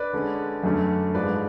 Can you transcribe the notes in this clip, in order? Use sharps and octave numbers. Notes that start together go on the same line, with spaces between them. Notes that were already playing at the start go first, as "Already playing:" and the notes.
Already playing: B4 D5
D3 G#3 C#4
F#2 D3 F#3 A3 C#4
G#2 F3 G#3 B4 D5